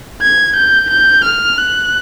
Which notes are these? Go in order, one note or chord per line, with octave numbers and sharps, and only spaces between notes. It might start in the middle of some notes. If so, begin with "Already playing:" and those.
G#6
G6
G6
F6
F#6